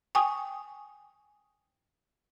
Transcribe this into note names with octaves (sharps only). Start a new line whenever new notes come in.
G5 G#5 C#6 D#6